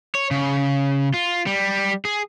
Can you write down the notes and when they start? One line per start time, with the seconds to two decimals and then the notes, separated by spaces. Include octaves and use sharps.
0.15 C#5
0.31 C#3
1.14 F4
1.47 G3
2.05 G#4